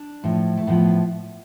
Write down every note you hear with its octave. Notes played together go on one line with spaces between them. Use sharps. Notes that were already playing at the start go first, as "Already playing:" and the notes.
Already playing: D4
A2 F3
A3
A2 F3 B3